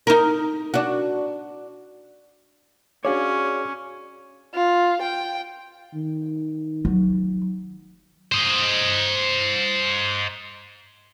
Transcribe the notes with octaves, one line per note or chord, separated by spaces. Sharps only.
D#4 A#4
D4 F#4
C#4 D4 F#4 G#4 C#5 F5 D6
F4
G5
D#3
F#3
C5 D#5